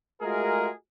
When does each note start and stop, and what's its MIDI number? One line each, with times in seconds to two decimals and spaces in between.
0.22 0.70 56
0.22 0.70 57
0.22 0.70 65
0.22 0.70 66
0.22 0.70 68
0.22 0.70 70